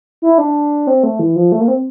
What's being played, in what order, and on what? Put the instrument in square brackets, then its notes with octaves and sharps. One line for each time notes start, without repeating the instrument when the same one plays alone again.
[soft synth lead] E4
D4
C4
A3
E3
F3
A3
A#3
C4